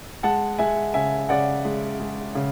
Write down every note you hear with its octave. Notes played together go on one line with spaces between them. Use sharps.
G#3 F#5 A5
G#3 E5 G#5
C#3 E5 G#5
C#3 D5 F#5
G#3
G#3
C#3